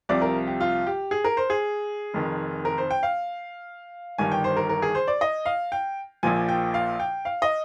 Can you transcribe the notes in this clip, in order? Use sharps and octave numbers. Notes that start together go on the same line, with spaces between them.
C2 C3 F3 D5
A#4
G4
F4
G4
G#4
A#4
C5
G#4
F1 F2 D#3
A#4
C5
G5
F5
G1 G2 D#3 G#5
G5
C5
A#4
A#4
G#4
C5
D5
D#5
F5
G5
A#1 A#2 F3 G#5
G5
F5
G5
F5
D#5